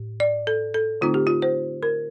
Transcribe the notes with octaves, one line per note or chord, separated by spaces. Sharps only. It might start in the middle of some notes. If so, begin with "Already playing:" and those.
Already playing: A2
D5
A4
A4
D3 A3 C4 D#4 F4
G4
F4
C5
A#4